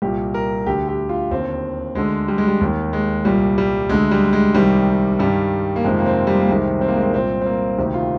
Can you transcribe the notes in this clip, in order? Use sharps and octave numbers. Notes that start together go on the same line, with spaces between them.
C2 A#2 G4
A#4
D2 D3 G4
G4
F4
D#2 D3 C4
D2 D3 G#3
G3
G#3
G3
D#2 D#3
G#3
C2 A#2 G3
G3
D2 D3 G#3
G3
G#3
C2 C3 D#3 G3
G2 D#3 G3
A#3
F2 C3 D#3 G#3
A#3
C4
G3
A#3
C2 C3 D#3 G#3
C4
A#3
G#3
A#3
C2 A#2 C4
C4
A#3
D2 C3 D#3
F4